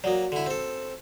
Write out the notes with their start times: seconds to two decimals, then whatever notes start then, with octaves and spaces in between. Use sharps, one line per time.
0.04 F#3 A#3 F#4 D5
0.32 D3 E4
0.46 C4 A4